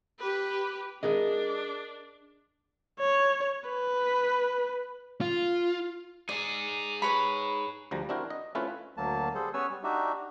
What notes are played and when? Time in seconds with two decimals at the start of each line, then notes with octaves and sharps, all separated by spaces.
0.19 G4 B4
1.03 D4 G#4 A#4 D#5
3.00 C#5
3.70 B4
5.21 F4
6.29 D#4 G#4 D5
7.02 B4 C#5 B5
7.91 D2 F3 G3 A#5
8.09 C4 D4 E4 F#4 A#4 G5
8.30 D#5
8.55 A3 C4 C#4 E4 F4 B4
8.97 D2 F#3 A#3 A5
9.35 G3 G#4 A4 C5
9.54 B3 C#4 B4 C#5 G#5 E6
9.70 G3
9.84 D4 D#4 F#4 G4 E5